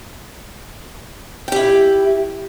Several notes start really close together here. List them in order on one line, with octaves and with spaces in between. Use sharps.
G5 G4 E4